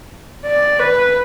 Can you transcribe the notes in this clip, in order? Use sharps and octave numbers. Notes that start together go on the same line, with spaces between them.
D5
B4